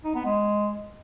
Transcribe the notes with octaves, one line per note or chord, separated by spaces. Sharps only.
D#4
B3
G#3